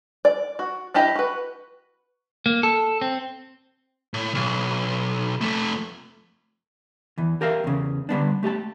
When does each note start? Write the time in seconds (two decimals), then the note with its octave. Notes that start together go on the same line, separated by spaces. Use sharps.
0.25 D5
0.59 F#4
0.94 D4 E4 G4 D#5
1.16 F#4 B4
2.46 A#3
2.63 A4
3.02 C4
4.14 A2
4.34 B1
5.41 F2 A3
7.18 E2 E3
7.41 G4 A#4 E5 F5
7.64 E2 C#3
8.09 D3 G3 B3 D4
8.43 A3 G4 D#5 A5